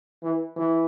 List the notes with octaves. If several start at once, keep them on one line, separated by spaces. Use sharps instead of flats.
E3
E3